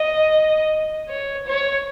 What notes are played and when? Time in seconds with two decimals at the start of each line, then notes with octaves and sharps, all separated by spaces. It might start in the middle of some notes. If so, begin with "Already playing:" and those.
Already playing: D#5
1.09 C#5
1.47 C#5